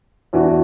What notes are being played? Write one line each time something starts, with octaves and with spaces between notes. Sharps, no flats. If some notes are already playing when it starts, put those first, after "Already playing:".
E2 E3 D4 F#4